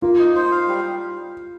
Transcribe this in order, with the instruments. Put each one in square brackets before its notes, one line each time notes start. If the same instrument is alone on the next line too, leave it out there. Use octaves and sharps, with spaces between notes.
[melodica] A#3 [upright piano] F4
[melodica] D#4
C5
F5
G3